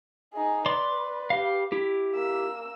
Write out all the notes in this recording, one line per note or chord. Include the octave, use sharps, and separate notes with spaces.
D#4 G#4
B4 D5 C6 D6
G4 F5
E4 G4
A#3 E6